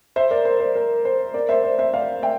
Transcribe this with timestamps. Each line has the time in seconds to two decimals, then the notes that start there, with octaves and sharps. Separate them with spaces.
0.16 C5 E5
0.31 A#4 D5
0.45 C5
0.60 C5
0.75 A#4
1.05 C5
1.34 A#4 D5
1.49 C5 E5
1.64 C5
1.79 C5 E5
1.94 D5 F5
2.23 E5 G5